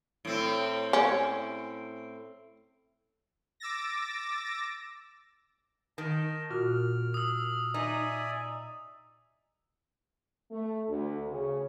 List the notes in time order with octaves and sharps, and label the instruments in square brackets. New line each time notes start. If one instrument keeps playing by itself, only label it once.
[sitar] A2 C4
[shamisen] C#4
[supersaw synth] D6 E6 A6 A#6
[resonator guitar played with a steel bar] D#3 [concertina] D#5 A5
[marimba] A#2 F4 F#4 [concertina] F6
[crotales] D#6 E6
[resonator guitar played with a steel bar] D#4 [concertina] D5 E5 G#5
[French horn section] A3
D2
C#3